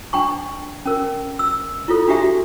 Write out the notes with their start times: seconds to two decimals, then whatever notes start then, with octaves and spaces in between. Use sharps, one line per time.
0.13 D4 G5 A5 C#6
0.86 C#4 A#4
1.39 E6
1.88 E4 F4 A4
2.08 D4 F#4 G4 E5 A5